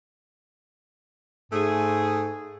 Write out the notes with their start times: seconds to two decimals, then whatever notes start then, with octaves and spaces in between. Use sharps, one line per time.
1.52 G#2 A3 G#4